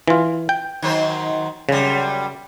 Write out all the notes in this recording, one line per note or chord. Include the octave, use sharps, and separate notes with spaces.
E3 F4
G5
D#3 F#3 C5
F#2 C#3 G3